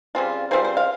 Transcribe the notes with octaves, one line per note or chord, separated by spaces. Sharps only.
C#3 G3 C4 F4
C#3 G3 C4 F4 C5
C5
F5